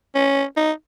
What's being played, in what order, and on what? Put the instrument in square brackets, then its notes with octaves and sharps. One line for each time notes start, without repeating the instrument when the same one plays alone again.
[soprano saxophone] C#4
D#4